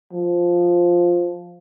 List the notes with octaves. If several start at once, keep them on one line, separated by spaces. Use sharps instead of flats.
F3